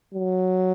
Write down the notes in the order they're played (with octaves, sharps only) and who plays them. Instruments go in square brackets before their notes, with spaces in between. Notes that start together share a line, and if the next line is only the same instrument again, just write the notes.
[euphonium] F#3